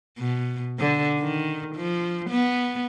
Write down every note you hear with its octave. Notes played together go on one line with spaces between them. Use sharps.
B2
D3
D#3
F3
B3